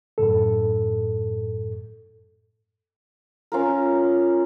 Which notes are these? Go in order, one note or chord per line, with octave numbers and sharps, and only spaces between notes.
F#2 A2 A4
C#4 F4 A#4